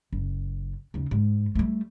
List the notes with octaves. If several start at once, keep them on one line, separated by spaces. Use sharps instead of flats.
F#1
D#2 C#3
G#2
G3 A3